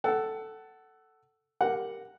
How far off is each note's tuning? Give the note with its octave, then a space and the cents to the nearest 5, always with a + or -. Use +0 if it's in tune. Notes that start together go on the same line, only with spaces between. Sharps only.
A4 +0 F#5 +20
G4 +0 A#4 -10 F#5 +0